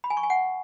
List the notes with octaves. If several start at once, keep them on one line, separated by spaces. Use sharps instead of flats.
B5
G#5
C#6
G#5
F#5